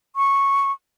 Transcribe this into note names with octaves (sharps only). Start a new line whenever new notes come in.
C#6